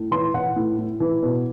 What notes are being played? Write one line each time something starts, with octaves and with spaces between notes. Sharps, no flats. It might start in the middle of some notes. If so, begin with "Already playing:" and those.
Already playing: A2
E3 C6
E3 F#5
A2
A2
E3
B2